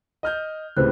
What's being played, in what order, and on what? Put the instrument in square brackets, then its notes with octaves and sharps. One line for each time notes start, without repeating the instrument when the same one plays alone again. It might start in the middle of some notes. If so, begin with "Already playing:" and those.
[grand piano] D#5 F6 G6
[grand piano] C#2 A2 C3 [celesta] B4 C5 F#6